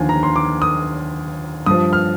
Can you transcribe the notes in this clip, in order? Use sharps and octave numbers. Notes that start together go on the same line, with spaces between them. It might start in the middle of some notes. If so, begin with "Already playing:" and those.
Already playing: D#2 D3 F3 G#5
A#5
C6
D6
D#6
G2 F3 D#6
F6